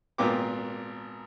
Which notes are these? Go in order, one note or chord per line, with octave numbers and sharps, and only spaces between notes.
G#1 A#2 B3 F4 G5 D6